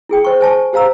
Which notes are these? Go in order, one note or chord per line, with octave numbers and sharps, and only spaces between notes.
E4 G#4 G5
C5 C#6
C5 G#5 A5 C#6
G4 C5 F5 A#5 E6